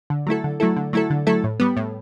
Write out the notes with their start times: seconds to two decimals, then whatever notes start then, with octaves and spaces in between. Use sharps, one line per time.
0.10 D3
0.27 F#3 A3 E4 A4
0.44 D3
0.60 F#3 A3 E4 A4
0.77 D3
0.93 F#3 A3 E4 A4
1.10 D3
1.27 F#3 A3 E4 A4
1.44 A2
1.60 G3 B3
1.77 A2